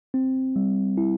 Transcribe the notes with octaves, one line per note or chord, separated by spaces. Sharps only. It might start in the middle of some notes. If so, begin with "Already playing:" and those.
C4
G3
E4